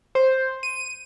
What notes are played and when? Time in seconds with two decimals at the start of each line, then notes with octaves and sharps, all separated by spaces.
0.15 C5
0.63 D#7